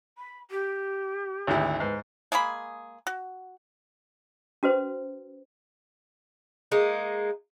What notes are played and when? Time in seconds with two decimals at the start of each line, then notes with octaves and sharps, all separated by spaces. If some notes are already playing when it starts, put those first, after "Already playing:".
0.18 B5
0.50 G4
1.47 G#1 D2 E4
1.80 G#2 B4
2.32 G#3 A#3 G#4 B5
3.07 F#4
4.63 C#4 F#4 B4 C5
6.72 G#3 A#3 D#4